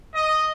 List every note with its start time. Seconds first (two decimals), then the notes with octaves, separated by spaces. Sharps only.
0.15 D#5